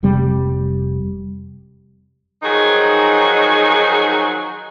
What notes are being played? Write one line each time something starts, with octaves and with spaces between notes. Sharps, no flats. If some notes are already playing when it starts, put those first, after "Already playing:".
F1 C3 G3
D#3 F3 F#3 D#4 G#4